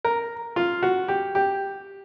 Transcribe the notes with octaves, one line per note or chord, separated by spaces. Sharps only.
A#4
F4
F#4
G4
G4